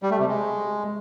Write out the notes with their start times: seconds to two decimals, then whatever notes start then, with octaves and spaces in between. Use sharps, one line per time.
0.03 G3
0.11 A3
0.20 C3
0.28 G#3